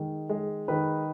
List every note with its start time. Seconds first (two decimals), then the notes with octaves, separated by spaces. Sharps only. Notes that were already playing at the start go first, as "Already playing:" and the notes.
Already playing: D#3 G#3
0.29 G#3
0.68 D#3 B4